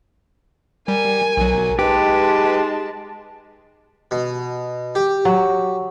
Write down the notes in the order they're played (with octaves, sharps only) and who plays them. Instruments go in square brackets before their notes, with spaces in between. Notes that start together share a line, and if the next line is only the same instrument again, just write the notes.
[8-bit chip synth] G3 [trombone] A#4 [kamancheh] G#5
[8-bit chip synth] B1 F#3
[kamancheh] G#3 A5 [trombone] D#4 [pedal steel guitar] G4 [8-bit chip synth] B4
[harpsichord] B2
G4
[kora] F#3